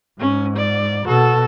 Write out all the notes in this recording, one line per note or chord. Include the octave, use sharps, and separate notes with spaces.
G#2 C#4
D5
B2 F#4 A4